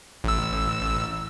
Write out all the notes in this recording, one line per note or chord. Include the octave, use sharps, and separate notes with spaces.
A1 E6